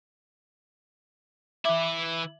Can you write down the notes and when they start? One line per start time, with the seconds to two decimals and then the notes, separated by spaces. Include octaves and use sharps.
1.65 E3 E4 E5 D6